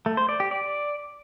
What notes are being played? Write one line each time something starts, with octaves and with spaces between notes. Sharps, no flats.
A3
C5
D5
G4
D5